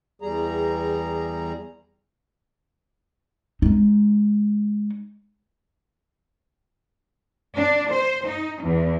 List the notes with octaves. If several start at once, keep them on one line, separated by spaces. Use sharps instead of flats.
E2 G3 G#4 A#5
G#3 D#4
D4
C5
D#4
E2